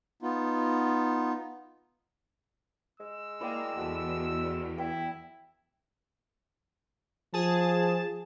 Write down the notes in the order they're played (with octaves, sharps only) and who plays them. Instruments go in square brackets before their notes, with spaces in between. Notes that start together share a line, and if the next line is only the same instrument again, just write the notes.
[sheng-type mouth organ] B3 D#4 F4
[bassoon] G#3 [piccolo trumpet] E6
[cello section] A#3 [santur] E4 D5 G5
[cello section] E2 [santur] F#4 A4
[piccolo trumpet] E4 [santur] G5 E6
[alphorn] F3 [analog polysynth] G#4 A5